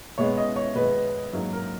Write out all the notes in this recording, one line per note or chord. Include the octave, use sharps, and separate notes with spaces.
B2 G#3 B3 C#5
D#5
C#5
B2 G#3 B3 B4
G#2 F#3 A#3
A#4